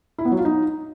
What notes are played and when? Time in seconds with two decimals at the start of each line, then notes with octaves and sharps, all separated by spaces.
0.18 E4
0.25 B3
0.32 F#3
0.38 F4
0.45 D#4